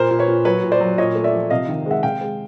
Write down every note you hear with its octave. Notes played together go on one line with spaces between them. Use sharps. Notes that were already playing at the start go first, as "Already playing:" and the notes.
Already playing: A#2 A#4 C5
A#2
B4 C#5
A#2
F#3 B4 C#5
A#2
C5 D5
F#3
A#2 C#5 D#5
A3
D5 E5
F3
C3 D#5 F5
D#3
G#3 E5 F#5
C3 F5 G5
G#3